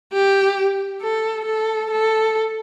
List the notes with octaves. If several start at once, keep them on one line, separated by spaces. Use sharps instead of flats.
G4
A4
A4
A4